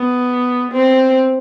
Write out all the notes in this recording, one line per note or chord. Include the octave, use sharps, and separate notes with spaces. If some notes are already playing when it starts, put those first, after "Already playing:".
Already playing: B3
C4